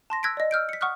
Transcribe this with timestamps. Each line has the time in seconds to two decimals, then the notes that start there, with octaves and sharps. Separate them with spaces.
0.10 A5 C6 A#6
0.23 E6 F#6 G#6 A#6 B6 D7
0.37 D5 D#5
0.51 E6 F6 G6 D7
0.69 B6 C#7
0.81 F#5 C#6 D#6 F6 F#6